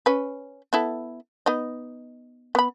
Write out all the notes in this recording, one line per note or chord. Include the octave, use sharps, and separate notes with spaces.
C#4 B4
B3 E4 A4
B3 D#4 D#5
B3 B5